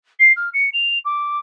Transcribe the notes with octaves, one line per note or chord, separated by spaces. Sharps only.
C7
F6
C#7
F7
D6